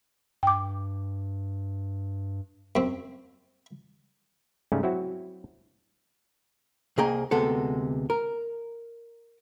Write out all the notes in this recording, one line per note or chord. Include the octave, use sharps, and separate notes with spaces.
G2 G5 D6
F#2 C4
G#2 C#3 G3 A3 C#4
F#3 C4 E4 F#4
C2 A#3 G#4 D#5 G5 A#5
D2 C3 G#3 B3 A4
A#4